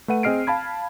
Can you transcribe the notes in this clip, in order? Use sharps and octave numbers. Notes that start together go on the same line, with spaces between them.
A3 B4 F#5 D#7
C4 G#4 D#5 F6 C7 D7
F5 A5 B5 G#6